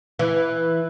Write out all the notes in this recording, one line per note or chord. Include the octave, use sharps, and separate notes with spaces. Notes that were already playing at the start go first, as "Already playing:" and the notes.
E3